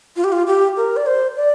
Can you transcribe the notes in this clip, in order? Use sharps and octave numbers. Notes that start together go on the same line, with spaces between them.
F4
G4
F4
G4
A#4
D5
C5
D5